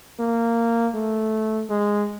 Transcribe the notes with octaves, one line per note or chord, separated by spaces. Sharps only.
A#3
A3
G#3